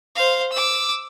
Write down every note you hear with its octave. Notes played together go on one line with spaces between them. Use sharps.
C5 F5
D6 E6